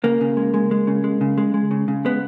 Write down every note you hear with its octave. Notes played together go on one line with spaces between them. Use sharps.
C#3 A#3
C#3
G#3
G#3
G#3
C#3
G#3
C#3
G#3
G#3
C#3
C#3
G#3 B3